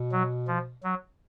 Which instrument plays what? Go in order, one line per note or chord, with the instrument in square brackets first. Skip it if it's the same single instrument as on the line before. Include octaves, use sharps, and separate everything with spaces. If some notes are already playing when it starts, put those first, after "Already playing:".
Already playing: [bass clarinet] B2
[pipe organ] F#3
F3
F#3